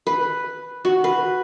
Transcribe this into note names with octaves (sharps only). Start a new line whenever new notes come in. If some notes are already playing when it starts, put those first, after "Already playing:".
B4
F#4
B4